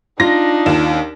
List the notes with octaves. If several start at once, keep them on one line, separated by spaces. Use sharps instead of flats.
D4 D#4 F4 A#6
D#2 E7